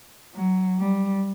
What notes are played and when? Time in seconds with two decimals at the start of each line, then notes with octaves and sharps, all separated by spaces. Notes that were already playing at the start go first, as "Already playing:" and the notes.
0.35 F#3
0.79 G3